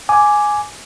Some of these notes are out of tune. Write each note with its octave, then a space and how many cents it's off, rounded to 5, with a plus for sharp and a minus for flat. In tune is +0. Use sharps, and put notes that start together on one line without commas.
G#5 +5 D6 +0